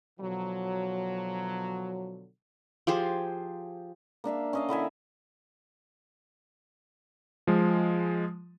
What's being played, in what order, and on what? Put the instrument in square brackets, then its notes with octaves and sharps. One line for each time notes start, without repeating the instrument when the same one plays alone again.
[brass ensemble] B2 D3 F3 F#3
[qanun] F3 G4 G#4 C5
[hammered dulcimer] A#3 D4 E5 F5
C#4 D#5 F5
D3 E4 E5 G#5
[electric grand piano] F3 G#3